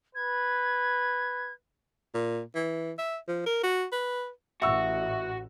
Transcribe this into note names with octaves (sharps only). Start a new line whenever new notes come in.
B4 G#6
A#2
E3
E5
F3
A#4
F#4
B4
A1 F#4 E5 C#6 E6